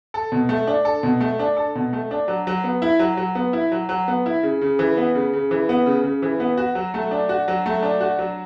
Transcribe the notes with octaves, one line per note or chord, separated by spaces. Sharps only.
A4
B2
A3
D4
A4
B2
A3
D4
A4
B2
A3
D4
F#3
F#3
B3
E4
F#3
F#3
B3
E4
F#3
F#3
B3
E4
C#3
C#3
E3
B3
C#3
C#3
E3
B3
C#3
C#3
E3
B3
F#4
F#3
A3
D4
F#4
F#3
A3
D4
F#4
F#3